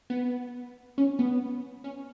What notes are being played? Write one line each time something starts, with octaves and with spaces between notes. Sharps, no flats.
B3
C#4
B3
C#4